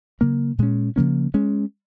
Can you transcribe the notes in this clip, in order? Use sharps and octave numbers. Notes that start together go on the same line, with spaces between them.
C#3 F#3 A#3
A#2 G#3 C#4
C#3 F3 A#3 C#4
G#3 C#4